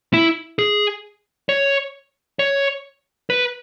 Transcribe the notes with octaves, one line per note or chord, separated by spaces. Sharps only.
E4
G#4
C#5
C#5
B4